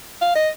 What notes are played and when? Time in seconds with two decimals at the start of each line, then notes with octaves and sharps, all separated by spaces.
0.21 F5
0.35 D#5